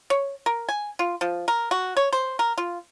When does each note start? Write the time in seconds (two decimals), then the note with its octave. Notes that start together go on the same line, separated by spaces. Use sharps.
0.10 C#5
0.46 A#4
0.69 G#5
0.99 F4
1.21 F3
1.48 A#4
1.71 F#4
1.97 C#5
2.13 C5
2.39 A#4
2.58 F4